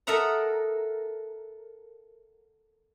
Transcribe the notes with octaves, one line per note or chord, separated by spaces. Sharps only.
A4 A#4 D#5 E5 F#5 A#5